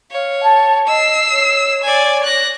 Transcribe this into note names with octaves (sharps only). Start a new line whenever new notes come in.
C#5 F5
A5
D#5 E6 C7
C#5
D5 G#5
F#6 A#6